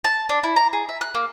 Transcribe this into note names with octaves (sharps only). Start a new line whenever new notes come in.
A5
D4
E4
A#5
G#4
E5
F#6
A#3